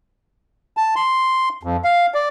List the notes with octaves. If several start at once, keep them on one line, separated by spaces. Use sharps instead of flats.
A5
C6
F2
F5
D5